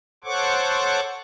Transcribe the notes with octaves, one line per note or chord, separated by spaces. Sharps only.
A4 C5 C#5 F#5 C#6 D6